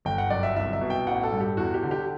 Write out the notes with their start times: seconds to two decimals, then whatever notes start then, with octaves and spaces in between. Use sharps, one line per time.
0.05 G1 G5
0.18 F#5
0.30 F#2 D5
0.43 E5
0.56 C2 E5
0.73 E5
0.81 B2
0.90 G5
1.06 A1 F#5
1.23 A4
1.32 G2
1.40 G4
1.57 E2 F#4
1.74 G4
1.82 D3
1.91 G4